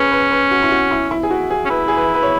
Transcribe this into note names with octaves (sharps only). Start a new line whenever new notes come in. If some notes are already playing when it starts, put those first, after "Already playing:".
Already playing: C#4 G#4 B4
B4
B4
F#4
E4
F#4
E4
E4
G#4
F#4
G#4
C#4
E4 B4
G#4
B4
B4
C#5